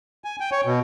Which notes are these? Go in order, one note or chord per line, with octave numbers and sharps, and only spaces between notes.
G#5
G5
C#5
B2